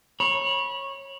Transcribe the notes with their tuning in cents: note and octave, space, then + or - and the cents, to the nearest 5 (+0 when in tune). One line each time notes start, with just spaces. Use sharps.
C#5 -20 B5 -25